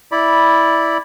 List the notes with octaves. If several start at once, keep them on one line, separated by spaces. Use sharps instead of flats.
E4 D5 B5